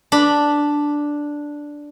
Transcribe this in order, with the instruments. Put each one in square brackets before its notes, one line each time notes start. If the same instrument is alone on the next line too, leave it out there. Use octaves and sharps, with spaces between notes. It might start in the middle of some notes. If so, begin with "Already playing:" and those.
[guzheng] D4 B5